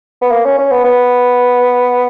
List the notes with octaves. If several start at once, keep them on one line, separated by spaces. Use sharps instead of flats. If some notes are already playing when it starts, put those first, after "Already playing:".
B3
A#3
C#4
C#4
B3
B3